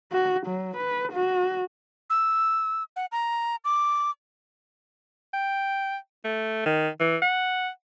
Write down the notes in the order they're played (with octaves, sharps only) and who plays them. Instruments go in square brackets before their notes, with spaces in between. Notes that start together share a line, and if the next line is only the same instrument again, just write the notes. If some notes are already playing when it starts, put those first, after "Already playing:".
[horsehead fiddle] F#4
F#3
B4
F#4
[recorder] E6
F#5
A#5
D6
[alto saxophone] G5
A3
D#3
E3
F#5